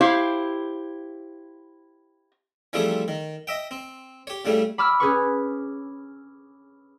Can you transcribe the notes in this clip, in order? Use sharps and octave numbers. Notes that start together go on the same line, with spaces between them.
E4 G4 C5 F5
E3 F3 G3 A3 C4 G#4
D#3
D#5 E5 G5
C4
G4 C#5
A2 C#3 G3 A3
B5 D6 E6 F6
C#4 G#4 B4 C#6